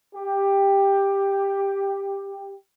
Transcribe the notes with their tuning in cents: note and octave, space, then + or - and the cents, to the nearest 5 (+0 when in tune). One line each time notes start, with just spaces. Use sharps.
G4 +10